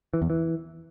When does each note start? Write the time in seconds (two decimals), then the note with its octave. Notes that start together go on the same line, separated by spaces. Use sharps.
0.14 E3
0.22 E2
0.30 E3